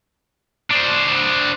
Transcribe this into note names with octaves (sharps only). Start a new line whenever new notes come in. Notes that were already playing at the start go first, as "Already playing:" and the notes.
D4 C5